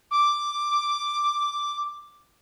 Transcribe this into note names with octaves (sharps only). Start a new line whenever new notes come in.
D6